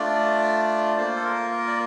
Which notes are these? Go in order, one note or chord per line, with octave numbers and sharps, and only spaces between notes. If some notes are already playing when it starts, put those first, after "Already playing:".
Already playing: A3 D4 F4 D5
A#3 F4 C5
A4
A#4
A#4
D5